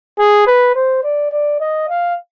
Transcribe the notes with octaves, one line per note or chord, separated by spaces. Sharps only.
G#4
B4
C5
D5
D5
D#5
F5